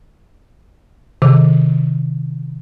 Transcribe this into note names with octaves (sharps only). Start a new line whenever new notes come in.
C3 D#3 D6